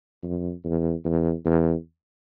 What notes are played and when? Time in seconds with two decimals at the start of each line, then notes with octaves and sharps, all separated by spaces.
0.23 F2
0.65 E2
1.05 E2
1.46 E2